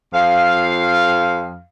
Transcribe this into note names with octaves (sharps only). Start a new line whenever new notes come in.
F2 F5